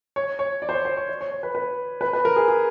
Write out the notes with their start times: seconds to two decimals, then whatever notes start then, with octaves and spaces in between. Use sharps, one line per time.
0.16 C#5
0.39 C#5
0.62 D5
0.69 C5
0.73 C#5
0.85 C5
0.97 C#5
1.09 D5
1.21 C#5
1.32 C#5
1.43 B4
1.55 B4
2.01 B4
2.13 B4
2.25 A#4
2.36 G#4
2.48 G#4